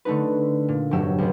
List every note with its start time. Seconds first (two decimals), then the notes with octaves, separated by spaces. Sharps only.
0.05 D3 A3 D#4 B4
0.68 A#2
0.91 F1 G2 F#3 G4 E6
1.18 C#2 B3